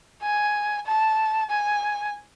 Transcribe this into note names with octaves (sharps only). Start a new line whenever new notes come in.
G#5
A5
G#5